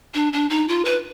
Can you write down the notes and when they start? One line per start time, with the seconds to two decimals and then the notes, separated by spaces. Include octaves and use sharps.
0.14 D4
0.33 D4
0.49 D#4
0.68 F4
0.85 B4